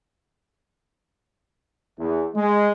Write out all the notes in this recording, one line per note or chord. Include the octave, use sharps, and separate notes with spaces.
E2
G#3